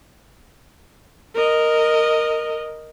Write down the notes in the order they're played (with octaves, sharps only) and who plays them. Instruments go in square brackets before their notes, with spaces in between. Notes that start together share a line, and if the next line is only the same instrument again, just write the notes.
[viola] A#4 D#5